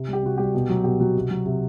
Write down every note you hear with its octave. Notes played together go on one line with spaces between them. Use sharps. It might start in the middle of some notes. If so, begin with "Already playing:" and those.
Already playing: C3
G3
G4
C3 F#4
G3 G4
B2
F#3
B2 G4
F#3 F#4
C3
F#3
C3